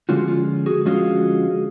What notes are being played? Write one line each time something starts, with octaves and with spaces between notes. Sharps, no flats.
D3 F3 G#3 C#4 F4 F#4
F4
F#4 G#4
D3 F3 G#3 C#4 F4 F#4 G#4